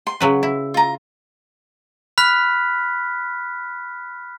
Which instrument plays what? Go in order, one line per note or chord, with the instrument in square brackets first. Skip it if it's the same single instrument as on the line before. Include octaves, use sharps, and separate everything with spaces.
[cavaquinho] C6
[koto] C#3 F#3 B4
E4
[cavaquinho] F4 A#5
[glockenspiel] B5 F6 F#6 B6